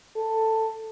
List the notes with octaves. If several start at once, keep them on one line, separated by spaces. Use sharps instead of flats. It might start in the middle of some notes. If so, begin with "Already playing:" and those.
A4